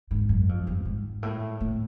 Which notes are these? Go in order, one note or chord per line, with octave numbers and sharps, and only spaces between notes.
G#2
F#2
F2
G2
G#2
A2
A2